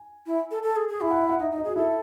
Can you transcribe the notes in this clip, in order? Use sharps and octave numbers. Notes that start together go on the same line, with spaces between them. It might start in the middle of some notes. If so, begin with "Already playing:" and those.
Already playing: G#5
E4
A4
A4
G#4
G#4
E4 G#5
F#5
E5
F#5
D#4 E5
D#4
D#5
F#4 G#4
E4 A4